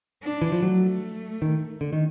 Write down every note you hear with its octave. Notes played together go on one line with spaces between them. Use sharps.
D4
E3
F3
F#3 A3
D#3
D3
D#3